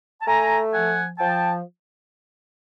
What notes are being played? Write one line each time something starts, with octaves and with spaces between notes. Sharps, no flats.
A5
A3 G#5 A#5
F3 F#5 G#5
F3 G5 A5